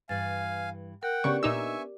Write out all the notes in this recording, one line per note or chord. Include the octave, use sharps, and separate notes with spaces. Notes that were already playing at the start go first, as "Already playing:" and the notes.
G2 E3 F5 G#5 A6
A#4 F#5 G5
C#3 B3 D4 G4 D5 C#6
A#2 D#4 E5 G#5 C#6 D6 E6